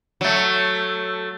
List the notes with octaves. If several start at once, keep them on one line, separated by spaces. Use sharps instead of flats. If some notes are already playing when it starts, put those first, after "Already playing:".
F#3 A3